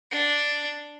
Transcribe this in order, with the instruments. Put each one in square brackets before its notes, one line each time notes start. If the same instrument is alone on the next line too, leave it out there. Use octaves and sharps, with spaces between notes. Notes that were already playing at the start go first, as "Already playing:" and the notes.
[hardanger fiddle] D4